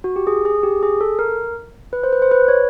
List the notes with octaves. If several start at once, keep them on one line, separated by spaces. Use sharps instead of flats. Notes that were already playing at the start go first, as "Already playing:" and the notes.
F#4
G4
G#4
G#4
G4
G#4
A4
A#4
B4
C5
B4
C5
B4
C#5